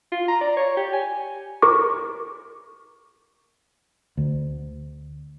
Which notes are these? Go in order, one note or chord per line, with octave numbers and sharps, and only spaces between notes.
F4
A#5
D5
C#5
G4
G#5
A#4 C#6 D6
D2